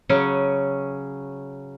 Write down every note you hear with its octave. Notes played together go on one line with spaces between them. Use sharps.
C#3 F#3 C#4